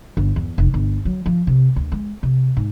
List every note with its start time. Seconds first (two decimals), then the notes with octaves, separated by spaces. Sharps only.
0.17 G1
0.36 E2
0.58 F1
0.74 G1
1.05 F#3
1.26 F3
1.47 C3
1.76 D2
1.92 G#3
2.23 C3
2.57 G#2